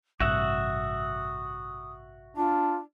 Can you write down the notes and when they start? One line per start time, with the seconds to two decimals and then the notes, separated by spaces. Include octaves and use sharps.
0.20 A1 G2 C3 F#4 E5 F#5 D#6
2.37 D4 F4